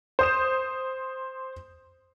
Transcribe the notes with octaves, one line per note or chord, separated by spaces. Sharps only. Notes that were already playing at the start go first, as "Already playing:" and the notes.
C5 D#6 E7